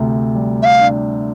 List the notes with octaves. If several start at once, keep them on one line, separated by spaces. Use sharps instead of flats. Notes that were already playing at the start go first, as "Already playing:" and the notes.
Already playing: D2 C3
G3
E5
F5
D4